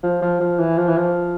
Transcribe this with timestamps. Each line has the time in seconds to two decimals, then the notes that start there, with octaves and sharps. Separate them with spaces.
0.03 F3
0.22 F3
0.40 F3
0.59 E3
0.78 F3
0.88 E3
0.97 F3